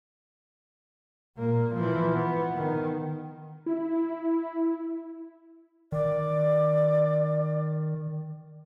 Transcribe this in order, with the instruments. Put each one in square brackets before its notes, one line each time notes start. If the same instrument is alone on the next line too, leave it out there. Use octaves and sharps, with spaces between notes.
[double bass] A#2 A#3
E3 F3
B3
D#3
[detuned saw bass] E4
[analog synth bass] D#3 [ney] D5